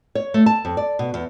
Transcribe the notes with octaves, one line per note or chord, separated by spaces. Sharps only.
C#5
A3
A5
F2
D5
B2
E2